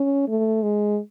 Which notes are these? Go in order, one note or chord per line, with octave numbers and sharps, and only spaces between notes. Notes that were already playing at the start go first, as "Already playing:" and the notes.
Already playing: C#4
A3
G#3